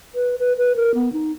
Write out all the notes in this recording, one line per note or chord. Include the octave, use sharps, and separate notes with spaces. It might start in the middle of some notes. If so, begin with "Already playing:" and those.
B4
B4
B4
A#4
B3
D#4